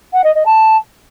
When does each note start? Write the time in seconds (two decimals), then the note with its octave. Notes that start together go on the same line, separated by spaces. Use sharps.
0.13 F#5
0.24 D#5
0.35 D#5
0.45 A5